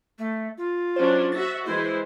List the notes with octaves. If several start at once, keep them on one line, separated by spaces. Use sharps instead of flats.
A3
F4
F#3 C#4 D4 C5
F#4 E5 A6 A#6
E3 G#3 E4 C5